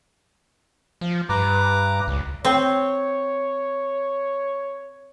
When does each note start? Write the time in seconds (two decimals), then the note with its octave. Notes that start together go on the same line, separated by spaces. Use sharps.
1.01 F3
1.29 G2 B4 A#5 D6
2.08 C#2
2.45 C4 C#5